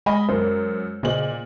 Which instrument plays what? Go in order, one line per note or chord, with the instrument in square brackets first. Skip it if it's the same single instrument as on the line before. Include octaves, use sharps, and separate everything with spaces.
[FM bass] G#3 [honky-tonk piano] D#5 G#5 B5
[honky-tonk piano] F#2 [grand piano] A#4 C5
[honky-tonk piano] A#2 F#7 [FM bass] C#3 [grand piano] G#4 C5 D#5